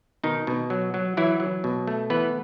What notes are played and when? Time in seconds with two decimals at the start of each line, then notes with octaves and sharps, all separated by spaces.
0.23 B2 D#3 D#4
0.47 B2
0.70 F#3
0.94 F#3
1.17 E3 F#3 E4
1.40 F#3
1.64 B2
1.88 A3
2.10 E3 B3 B4